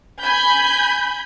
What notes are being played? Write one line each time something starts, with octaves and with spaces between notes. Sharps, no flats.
G#5 B5 G6